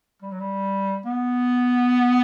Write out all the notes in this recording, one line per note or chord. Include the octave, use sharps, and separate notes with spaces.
G3
F#3
G3
B3